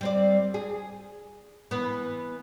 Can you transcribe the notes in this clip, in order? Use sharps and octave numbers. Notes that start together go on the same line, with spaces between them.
G3 C4 D5
G#4
E3 B3